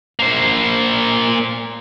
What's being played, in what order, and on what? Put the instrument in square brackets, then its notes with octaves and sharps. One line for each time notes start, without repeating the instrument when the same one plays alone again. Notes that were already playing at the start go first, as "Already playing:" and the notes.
[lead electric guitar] A#3 C5